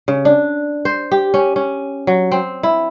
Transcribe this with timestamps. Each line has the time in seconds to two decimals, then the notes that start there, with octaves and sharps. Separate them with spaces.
0.08 C#3
0.25 D4
0.85 C5
1.12 G4
1.34 C#4
1.56 C#4
2.07 F#3
2.32 C4
2.63 E4